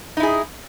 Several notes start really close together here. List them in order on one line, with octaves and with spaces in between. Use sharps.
D#4 E4 G#4